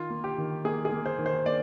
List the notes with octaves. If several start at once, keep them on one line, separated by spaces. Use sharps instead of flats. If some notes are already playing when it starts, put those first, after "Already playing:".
Already playing: D#3 F4
A#3
G4
D#3
A#3 G#4
G#4
A#3
C5
D#3
C5
A#3 D5